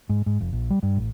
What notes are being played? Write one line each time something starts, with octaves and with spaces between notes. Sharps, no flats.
G#2
G#2
F1
A#1
G3
G2
A1